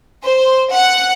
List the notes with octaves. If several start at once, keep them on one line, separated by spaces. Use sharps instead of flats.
C5
F#5